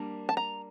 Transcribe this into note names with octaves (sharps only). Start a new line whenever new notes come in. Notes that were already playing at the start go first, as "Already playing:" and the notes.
Already playing: G3 A#3 D4
A5
A#5